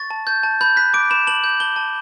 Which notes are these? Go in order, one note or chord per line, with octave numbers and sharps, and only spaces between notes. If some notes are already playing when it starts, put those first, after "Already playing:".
Already playing: C#6 A6
A5
A5 G6
A5
B5 G6
F#6 B6
D6 D7
B5 E7
A5 F#7
G6
A5 G7
A5